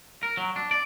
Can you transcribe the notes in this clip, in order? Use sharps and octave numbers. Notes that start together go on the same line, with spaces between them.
A#4
F#3
D4
D5